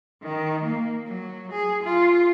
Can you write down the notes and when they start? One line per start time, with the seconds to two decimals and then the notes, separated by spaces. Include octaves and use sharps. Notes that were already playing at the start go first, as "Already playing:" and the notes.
0.23 D#3
0.64 A#3
1.06 F#3
1.52 G#4
1.83 F4